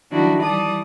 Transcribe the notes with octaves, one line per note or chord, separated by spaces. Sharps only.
D#3 F3 F#3 D4 E4 F#4
E3 G3 D5 A5 D#6